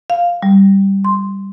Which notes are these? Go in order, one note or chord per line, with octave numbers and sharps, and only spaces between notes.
F5
G3
C6